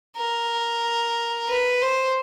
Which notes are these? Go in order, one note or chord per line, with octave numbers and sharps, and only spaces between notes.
A#4
B4
C5